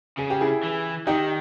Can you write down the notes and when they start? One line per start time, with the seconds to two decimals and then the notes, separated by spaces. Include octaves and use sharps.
0.18 C#3 G#4
0.30 G4
0.41 E4 G#4
0.63 E3
1.07 D#3 D#4 G4